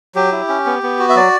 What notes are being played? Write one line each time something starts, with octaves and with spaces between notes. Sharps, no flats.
F#3 G4
E4
C#4
B3
B3
F#4
E5
F#3 D5